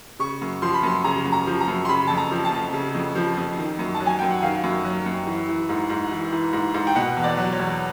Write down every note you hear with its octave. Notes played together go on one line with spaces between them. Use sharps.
C#3 C#6
F#2
F3 C6
B5
F#2 C6
C#3 A#5
F#2
A#5
F3
A#5
F#2
C6
C#3 B5
F2 A5
A#5
F3
A5
F2
C#3
F2
F3
F2
D#3
F#2
A5
F#3
G#5
F#2 G5
F#5
D#3 F5
F#2
F#3
F#2
E3
E3
G#2
G#2
E3
E3
G#2
G#2
G5
B2 F#5
E2
D5
F#3
C#5
E2